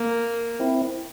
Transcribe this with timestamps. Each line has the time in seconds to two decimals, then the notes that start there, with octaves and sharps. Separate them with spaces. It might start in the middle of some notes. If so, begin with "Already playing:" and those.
Already playing: A#3
0.60 C4 E4